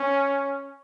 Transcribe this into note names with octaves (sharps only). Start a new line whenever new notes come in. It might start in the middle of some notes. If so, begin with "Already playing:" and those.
Already playing: C#4